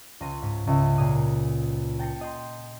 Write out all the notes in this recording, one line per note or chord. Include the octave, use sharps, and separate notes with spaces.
C#2 C#3 C6 A#6 D#7
G#2 B6
C#2 E5
A#2 G#4 D#6
G5 A5 A#6 C7 C#7
D#5 G5 C6